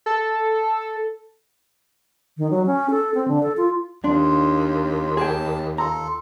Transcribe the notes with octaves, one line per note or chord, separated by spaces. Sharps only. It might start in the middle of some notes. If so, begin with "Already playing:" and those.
A4
D#3
F#3
C#4
A4
C4
D3
A4
F4
D#2 D4 F4
G#4 G5 A5
F4 A4 A#5